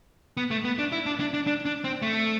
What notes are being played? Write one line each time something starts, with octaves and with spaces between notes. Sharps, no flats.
B3
A3
B3
D4
E4
D4
D4
D4
D4
D4
C4
A3